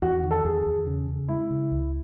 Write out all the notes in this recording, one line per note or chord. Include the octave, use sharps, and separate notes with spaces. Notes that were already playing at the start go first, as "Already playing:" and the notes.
E2 F#4
D#3
A4
E2 G#4
E2
C#3
C#3
G#3 E4
C#3
C#2